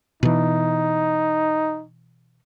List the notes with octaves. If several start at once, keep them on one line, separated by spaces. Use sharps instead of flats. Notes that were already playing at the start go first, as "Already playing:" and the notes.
B2 E3 D#4